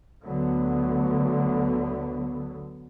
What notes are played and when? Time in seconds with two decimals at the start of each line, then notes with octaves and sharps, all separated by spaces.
0.24 D2 D3 F#3 B3